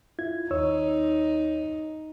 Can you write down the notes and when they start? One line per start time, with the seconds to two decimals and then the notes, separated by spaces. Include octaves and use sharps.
0.19 E4 F4 G#6
0.51 D#2 D#4 C#5 E6